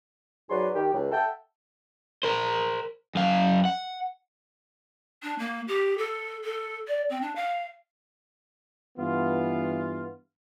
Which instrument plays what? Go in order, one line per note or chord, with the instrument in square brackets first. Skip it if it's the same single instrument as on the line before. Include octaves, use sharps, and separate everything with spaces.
[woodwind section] G#2 F#3 G#4 B4 D5 C6
D#3 G4
C#2
A4 E5 F#5 G5
[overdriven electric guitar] A#4 C5
F#2 F5
F#5
[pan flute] D4
A#3
G4
A4
A4
D5
C4
D4
F5
[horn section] G2 E3 B3 F4